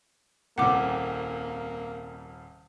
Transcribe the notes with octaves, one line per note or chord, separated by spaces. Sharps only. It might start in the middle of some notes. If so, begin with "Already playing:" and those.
D#1 C2 A#3 F#5 D6